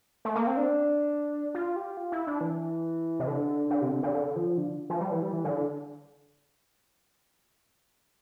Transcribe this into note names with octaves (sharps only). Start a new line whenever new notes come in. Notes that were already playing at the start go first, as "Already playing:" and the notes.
A3
A#3
C4
D4
F4
G4
F4
E4
D4
E3
C3
D3
D3
C3
D3
D3
D3
F3
D3
F3
G3
E3
G3
E3
D3